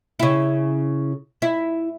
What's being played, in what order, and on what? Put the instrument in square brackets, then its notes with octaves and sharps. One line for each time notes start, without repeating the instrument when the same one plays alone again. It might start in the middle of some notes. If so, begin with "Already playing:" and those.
[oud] C#3 E4
E4